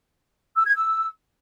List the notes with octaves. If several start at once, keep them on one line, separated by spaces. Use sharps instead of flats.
E6
G#6
E6